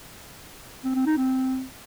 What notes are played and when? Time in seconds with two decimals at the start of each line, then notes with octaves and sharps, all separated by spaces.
0.84 C4
0.95 C4
1.06 D#4
1.17 C4